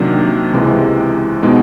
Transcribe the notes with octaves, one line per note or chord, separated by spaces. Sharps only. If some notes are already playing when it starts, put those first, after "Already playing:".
Already playing: C3 D#3 F#3 A#3 D4
C#2 C3 E3 G#3
B2 G#3 B3 D#4